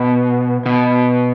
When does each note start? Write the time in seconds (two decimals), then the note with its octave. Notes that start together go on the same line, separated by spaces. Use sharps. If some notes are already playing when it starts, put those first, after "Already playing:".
Already playing: B2
0.66 B2